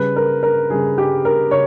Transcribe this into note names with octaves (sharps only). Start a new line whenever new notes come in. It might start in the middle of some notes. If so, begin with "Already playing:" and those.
Already playing: C#3 G3 B4
A#4
A#4
C#3 G3 G#4
G4
A#4
C#3 C#5